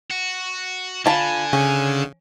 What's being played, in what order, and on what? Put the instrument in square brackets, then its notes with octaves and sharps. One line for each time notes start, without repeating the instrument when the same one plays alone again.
[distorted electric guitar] F#4
[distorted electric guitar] D3 [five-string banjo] F4 A5 B5 [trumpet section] G#5
[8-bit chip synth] C#3 [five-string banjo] C#4